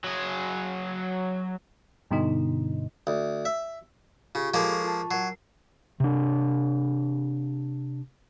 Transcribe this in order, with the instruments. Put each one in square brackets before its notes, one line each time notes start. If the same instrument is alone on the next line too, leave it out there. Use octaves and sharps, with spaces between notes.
[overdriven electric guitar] F#3 G#4
[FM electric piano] G2 B2 D3 D#4
[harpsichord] D2
E5
[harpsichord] C#3 [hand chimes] F4 G4 C#6
[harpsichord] F3 G#3 A#3 [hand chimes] A4 C7
[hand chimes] C#6
F4 A5
[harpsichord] F#3 [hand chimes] A#4 C7
[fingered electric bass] C3 D4